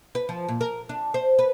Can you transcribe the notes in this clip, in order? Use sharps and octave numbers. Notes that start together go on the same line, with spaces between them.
B4
F3
A#2
A#4
D4
C5
B4